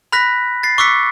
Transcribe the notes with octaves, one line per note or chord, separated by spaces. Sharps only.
B5 F6 F#6 A#6 B6
A6 C7
C#6 D6 E6 F#6 B6 C#7